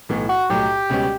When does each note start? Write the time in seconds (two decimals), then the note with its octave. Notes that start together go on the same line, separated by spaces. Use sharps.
0.09 B1 A2 E3 B3
0.29 F#4
0.50 B1 A2 F#3 G4
0.90 C#2 B2 G3 C#4